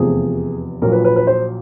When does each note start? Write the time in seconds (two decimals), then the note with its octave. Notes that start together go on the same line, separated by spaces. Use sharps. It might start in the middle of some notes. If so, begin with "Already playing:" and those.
Already playing: F1 E2 C3 F3 G#4
0.82 A#1 A#2 F#3 A#4
0.92 B4
1.05 B4
1.16 B4
1.27 C5